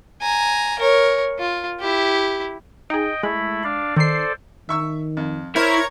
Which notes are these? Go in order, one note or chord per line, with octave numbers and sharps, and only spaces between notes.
G#5 A#5
A#4 C#5
F4
E4 G4
D#4 G#4 D#5 G5
G#3 A3 E4 B5
D4 D5 F5
D#3 A4 C5 D5 C7
D#3 E5 C#6 E6
F2
E4 A#4 C5 C#5 G#6